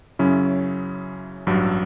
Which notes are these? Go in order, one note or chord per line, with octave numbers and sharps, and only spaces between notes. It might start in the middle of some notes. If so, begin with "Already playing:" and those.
F#2 C#3 F#3 C#4 E4
A1 G2 F#3